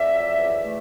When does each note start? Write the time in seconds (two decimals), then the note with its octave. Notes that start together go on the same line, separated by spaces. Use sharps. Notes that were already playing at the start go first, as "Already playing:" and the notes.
Already playing: F2 D5 E5
0.12 F#3
0.38 E2
0.64 A3